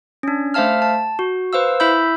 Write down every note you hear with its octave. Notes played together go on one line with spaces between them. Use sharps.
C#4 D4
A3 C5 E5 F5 A5 F6
A5
F#4
B4 C5 F5 E6
E4 E5 B5 E6 G6